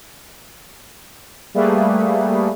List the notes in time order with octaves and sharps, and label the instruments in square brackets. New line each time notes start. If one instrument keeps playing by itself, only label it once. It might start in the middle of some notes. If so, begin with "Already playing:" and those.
[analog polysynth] G3 A3 A#3 G#4 B4